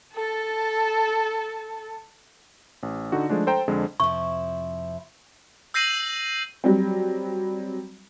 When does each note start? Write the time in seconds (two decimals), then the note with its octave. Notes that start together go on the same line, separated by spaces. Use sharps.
0.15 A4 A5
2.83 A1
3.12 D3 D#4 F#4
3.29 F3 G#3 A3 D4
3.47 A4 C5 G5 A#5
3.68 F2 D3 G#3 C4
4.00 F2 C3 F3 E4 C#6
5.74 E6 G6 A#6 C7 D#7 F#7
6.64 F#3 G3 C4